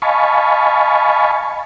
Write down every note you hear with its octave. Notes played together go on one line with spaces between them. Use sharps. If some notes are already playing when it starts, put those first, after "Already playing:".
D#5 F5 G#5 A5 B5 C#6